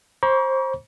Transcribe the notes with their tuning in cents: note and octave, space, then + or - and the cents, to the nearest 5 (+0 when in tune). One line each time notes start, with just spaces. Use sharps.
C5 +20 A#5 +45 C#6 +45